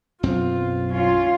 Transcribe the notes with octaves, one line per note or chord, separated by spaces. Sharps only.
B1 F#2 C4 F4
C#4 F4